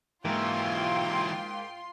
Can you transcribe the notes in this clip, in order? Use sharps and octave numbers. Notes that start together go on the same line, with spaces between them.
G#2 E3 F#3 A#3 F4 G5 C6